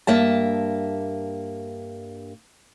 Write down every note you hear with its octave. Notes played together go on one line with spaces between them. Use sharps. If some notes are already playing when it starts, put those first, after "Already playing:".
G2 A#3 E5 A5